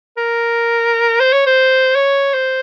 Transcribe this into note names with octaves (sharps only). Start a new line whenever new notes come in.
A#4
C5
C#5
C5
C#5
C5